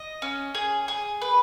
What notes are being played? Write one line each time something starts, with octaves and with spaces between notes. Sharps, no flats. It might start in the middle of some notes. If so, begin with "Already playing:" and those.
Already playing: D#5
C#4
G#4
G#4
B4